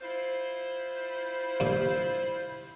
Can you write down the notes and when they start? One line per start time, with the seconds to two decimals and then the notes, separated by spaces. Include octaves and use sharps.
0.02 E4 F4 C5
1.60 G2 A#2